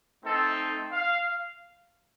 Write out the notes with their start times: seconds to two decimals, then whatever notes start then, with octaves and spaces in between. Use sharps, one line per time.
0.24 A3 C4 D#4 A4
0.92 F5